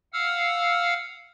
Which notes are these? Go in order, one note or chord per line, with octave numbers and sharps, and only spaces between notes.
F5 F#5 E6 F6